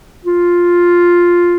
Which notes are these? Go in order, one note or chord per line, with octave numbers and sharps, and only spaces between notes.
F4